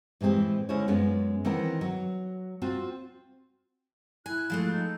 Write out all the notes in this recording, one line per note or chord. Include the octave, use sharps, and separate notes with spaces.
A2 E3 G#3 C4 G4
D3 G#3 C#4 E4 C5 C#5
F#2 G#3 B3 C#4 F4
D#3 E3 C4 A#4 F#5
F#3
C4 F4 F#4
E4 G#5 F#6
F3 G#3 A3
D#4 A4 G6